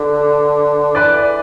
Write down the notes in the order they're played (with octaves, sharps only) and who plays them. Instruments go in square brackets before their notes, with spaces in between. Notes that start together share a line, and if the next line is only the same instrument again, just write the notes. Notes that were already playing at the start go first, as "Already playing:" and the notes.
Already playing: [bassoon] D3 [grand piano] B4
[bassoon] E3 [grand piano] B4 D5